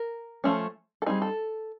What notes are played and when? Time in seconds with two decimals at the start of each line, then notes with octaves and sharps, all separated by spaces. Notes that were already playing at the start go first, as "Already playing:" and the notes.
Already playing: A#4
0.44 F3 A3 C#4
1.02 A4
1.06 G3 C4 D#4 G#4
1.22 A4